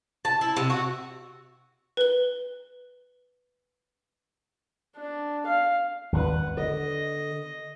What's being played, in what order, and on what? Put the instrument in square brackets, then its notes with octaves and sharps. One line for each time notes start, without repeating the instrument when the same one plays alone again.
[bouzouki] A5
E4
C3
F#4
[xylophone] B4 G7
[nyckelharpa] D4
F5
[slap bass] G#1 D#2 G3 [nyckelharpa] B4 F#5
[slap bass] D3 [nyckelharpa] D#5